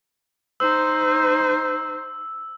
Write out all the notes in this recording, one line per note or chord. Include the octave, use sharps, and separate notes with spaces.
D#4 C5 E6